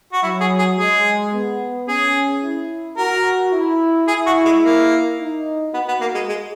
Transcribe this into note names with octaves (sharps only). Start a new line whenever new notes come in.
F#4
F#3 E4
G#4
G#4
G#3 G#4
B3
C#4 G#4
E4
F#4 A#4
E4
E4 G#4
F#4
G#3
A#3
D#4
B3 F#4
B3
A#3
G#3
G#3